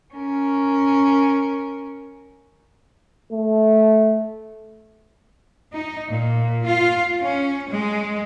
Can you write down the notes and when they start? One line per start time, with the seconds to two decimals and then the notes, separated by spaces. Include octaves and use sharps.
0.14 C#4 A#4
3.32 A3
5.73 D#4
6.11 A#2
6.65 F4
7.20 C#4
7.70 G#3